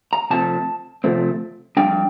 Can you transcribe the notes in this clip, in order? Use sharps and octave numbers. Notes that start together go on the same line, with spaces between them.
A#5
C3 F3 A3 C4 A5
C3 F3 A3 C4
F2 E3 G3 D4 G5